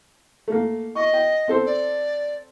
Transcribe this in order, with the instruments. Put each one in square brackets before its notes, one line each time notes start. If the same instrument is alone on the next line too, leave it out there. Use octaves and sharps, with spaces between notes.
[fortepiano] A3 A#3
[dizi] D#5 [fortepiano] C#6
[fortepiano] G5
C4 A4 C5
[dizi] D5